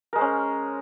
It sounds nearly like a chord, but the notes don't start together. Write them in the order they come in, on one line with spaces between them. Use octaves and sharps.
A#4 G#3 C5 C#4